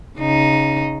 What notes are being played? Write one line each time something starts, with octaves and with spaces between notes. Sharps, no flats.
C#3 D#4